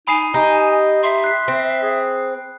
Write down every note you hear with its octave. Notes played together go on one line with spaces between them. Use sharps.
D#4 G#5 B5 D#6 C7
D#4 G4 D#5
E5 C6
F#6 C7
C4
G#4